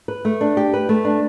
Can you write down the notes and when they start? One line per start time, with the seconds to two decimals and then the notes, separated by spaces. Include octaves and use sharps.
0.08 B4
0.25 A3
0.41 D4
0.57 G4
0.74 B4
0.89 A3
1.05 D4